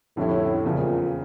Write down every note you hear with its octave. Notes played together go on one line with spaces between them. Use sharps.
F2 A2 D3 G3 C#4 E4
E2 A#2 C#3 F3